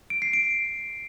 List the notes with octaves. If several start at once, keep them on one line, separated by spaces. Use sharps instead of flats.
D7
C7
D7